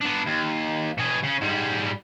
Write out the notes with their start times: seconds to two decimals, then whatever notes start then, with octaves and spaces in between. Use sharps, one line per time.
0.01 B3 D4
0.26 D#2
0.98 B2 G#4
1.24 C#3 C#4
1.41 G#2 G3